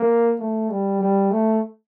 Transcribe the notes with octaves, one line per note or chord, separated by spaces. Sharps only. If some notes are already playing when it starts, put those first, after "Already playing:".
Already playing: A#3
A3
G3
G3
A3